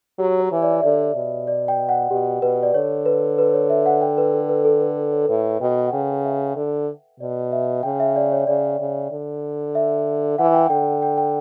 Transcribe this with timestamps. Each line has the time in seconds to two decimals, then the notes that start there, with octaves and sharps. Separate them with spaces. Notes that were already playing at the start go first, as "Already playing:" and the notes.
0.19 F#3 G4
0.40 C#5
0.52 E3
0.62 D5
0.74 E5
0.83 D3 D5
1.15 B2
1.47 D5
1.68 G5
1.89 F#5
2.10 B2 G4
2.42 B2 B4
2.63 D5
2.74 D3 C#5
3.06 B4
3.38 B4
3.54 C#5
3.70 E5
3.86 F#5
4.02 G5
4.18 B4
4.34 A4
4.49 B4
4.65 A4
4.81 B4
5.13 C#5
5.25 A4
5.28 A2 B4
5.60 B2 G5
5.87 F#5
5.93 C#3 G5
6.25 E5
6.56 D3
7.20 B2 D5
7.52 E5
7.83 C#3 G5
8.00 E5
8.16 D5
8.32 C#5
8.47 C#3 D5
8.80 C#3
9.11 D3
9.75 E5
10.38 E3 F#5
10.54 G5
10.70 D3 G5
11.02 G5
11.18 G5